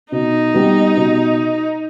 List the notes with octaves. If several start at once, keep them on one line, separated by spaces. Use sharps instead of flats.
B2 D#4
G3 B3
B2